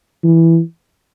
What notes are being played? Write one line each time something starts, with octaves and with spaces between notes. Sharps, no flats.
E3